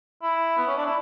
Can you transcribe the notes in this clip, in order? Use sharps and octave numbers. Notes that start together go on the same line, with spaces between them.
E4
B3
C#4
D4
E4